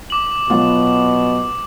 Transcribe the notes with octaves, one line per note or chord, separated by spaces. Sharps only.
D6 F#7
B2 F#3 B3 F4